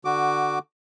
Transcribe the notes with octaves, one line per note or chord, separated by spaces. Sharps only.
D3 F#4 D6